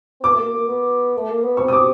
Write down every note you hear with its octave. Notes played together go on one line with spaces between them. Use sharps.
C4
B3 D6
A3
A#3
A#3
B3
A3
A#3
B3
C4 C#6
D#6
D6